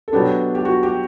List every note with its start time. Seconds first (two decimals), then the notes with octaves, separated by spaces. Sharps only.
0.08 A4
0.13 B2 F#3 B3 D4 G4
0.55 G4
0.65 F#4
0.83 G4